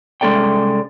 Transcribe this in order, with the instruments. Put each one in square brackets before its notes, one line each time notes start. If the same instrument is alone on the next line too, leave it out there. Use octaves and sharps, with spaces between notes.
[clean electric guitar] C2 G#3 C#4 A4 D5 G5